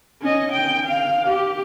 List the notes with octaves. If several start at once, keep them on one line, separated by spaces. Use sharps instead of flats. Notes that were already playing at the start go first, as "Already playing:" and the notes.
C#4 D#5
G5
F5
G4